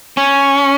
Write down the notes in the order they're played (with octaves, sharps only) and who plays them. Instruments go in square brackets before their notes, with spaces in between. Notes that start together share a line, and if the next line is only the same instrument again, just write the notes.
[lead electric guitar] C#4